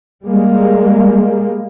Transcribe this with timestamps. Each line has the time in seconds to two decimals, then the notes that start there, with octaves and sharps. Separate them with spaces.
0.24 G3 G#3 A#3